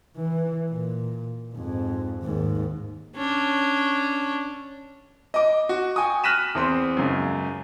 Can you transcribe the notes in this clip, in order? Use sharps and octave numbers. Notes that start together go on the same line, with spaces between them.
E3
A#2
F2 G#2
D#2 G#2
C#4 D4
D#5 D6
F#4
G5 G#5 C#6 D#6
F6 F#6 A#6 B6 D#7 E7
E2 C4 C6
C#2 F#2